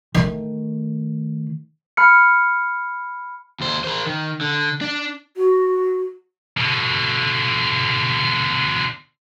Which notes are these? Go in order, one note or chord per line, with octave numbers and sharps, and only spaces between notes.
D#3 A3
B5 F6 C#7
D#2 C5
A#4 C5
D#3
D3
D4
F#4
B2 D3